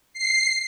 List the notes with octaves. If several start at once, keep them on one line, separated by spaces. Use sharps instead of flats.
C7